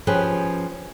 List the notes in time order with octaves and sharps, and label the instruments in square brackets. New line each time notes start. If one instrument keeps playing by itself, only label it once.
[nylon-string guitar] F3 C#4 G4 G#4 B4